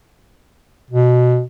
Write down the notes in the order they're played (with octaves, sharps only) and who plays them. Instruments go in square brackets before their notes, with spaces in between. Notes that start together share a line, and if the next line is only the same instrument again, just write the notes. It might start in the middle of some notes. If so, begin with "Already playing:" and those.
[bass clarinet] B2